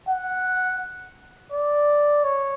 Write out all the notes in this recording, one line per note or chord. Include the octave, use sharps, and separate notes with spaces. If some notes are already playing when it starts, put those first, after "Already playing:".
F#5
D5
C#5